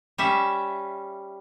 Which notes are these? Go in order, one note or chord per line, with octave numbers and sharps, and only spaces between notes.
G3 C#4 E5